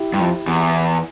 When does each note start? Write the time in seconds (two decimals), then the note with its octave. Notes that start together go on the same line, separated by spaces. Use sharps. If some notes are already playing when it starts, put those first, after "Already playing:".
Already playing: E4 G4
0.13 G2
0.20 F2
0.47 E2